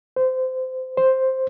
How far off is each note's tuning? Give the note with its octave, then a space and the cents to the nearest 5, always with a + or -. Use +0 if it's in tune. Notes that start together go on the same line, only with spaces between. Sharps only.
C5 -20
C5 +5